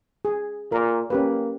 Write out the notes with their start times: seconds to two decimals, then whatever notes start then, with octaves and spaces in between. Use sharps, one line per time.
0.25 G#4
0.72 A#2 A#4
1.10 A#3 C#4 G4 B4